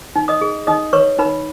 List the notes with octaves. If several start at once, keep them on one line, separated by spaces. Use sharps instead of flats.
D#4
D#5 D#6
G#4
D#4 D#5 D#6
B4 C#5 C#6
D#4 B4 B5